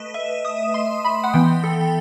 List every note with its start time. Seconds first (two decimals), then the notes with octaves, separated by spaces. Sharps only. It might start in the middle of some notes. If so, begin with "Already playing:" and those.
Already playing: A3 B4 D#5
0.14 E5
0.45 D#6
0.74 C6
1.04 B5
1.23 F#5
1.34 E3 B3 G5
1.64 A4